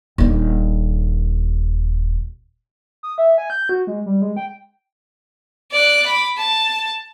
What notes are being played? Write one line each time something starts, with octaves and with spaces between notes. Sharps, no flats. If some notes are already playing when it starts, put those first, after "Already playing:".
D#1 D4
D#6
E5
G#5
G6
F#4
G#3
G3
G#3
G5
D5 F#6
B5 D6
A5